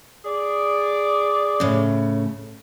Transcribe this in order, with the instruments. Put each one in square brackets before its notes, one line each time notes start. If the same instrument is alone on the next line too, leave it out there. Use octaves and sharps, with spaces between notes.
[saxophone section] G#4 D5
[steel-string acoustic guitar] A2 C#3